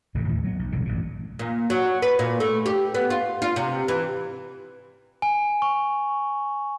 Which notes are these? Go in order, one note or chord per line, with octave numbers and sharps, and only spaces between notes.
D1 A1 F2 C#3
D#2 A2 D#3 E3
F#3 B3
B1
E1 C2 A2 D3
A1 G2 A#2
A#2
F#3
B4
A#2
A3
G4
B3
F4
F4
C3
E3
G#5
C#6